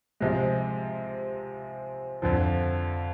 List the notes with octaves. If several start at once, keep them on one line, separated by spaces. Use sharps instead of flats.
C3 F3 G#3
F2 D3 F3